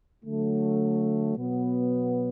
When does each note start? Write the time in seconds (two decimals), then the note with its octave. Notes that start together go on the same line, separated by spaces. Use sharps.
0.25 D3 F#3 A3
1.36 B2 F#3 B3